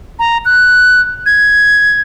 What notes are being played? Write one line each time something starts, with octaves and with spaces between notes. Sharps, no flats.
A#5
F#6
G#6